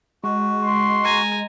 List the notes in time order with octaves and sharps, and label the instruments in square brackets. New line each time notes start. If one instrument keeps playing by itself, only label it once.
[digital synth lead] G#3 [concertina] F#4
[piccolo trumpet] C6
[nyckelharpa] G#5 A#5